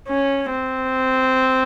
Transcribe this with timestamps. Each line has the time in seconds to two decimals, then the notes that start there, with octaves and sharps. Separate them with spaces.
0.08 C#4
0.50 C4